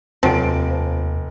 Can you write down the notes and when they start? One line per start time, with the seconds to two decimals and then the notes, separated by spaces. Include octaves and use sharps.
0.23 F1 D#2 F3 F#3 C4 D7